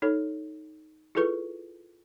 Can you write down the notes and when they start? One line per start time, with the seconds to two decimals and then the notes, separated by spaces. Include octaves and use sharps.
0.02 D#4 A4 C#5
1.15 E4 F4 G#4 A4 B4 C#6